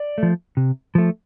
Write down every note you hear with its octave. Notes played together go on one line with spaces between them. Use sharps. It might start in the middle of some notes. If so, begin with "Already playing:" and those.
Already playing: D5
F3 A3
C3
F3 A3